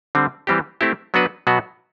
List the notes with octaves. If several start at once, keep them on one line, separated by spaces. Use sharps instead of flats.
D3 G3 C4
E3 G3 C4 G4
A3 C4 E4 G4
F#3 B3 D4 F#4 B4
B2 F#3 B3 F#4